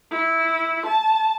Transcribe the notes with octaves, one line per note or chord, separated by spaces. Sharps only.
E4
A5